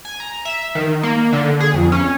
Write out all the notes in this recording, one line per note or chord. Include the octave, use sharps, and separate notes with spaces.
G#5
A#5
E5
D#3
A#3
D3
G#4
F2
C#4